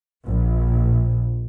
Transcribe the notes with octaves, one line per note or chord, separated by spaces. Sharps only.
A#1